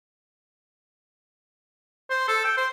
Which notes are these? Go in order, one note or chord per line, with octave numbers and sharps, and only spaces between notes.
C5
A4
G5
C5